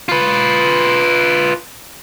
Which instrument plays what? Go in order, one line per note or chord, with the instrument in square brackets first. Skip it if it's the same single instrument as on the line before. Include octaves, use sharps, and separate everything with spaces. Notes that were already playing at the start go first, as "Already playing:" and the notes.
[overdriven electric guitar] F4 B4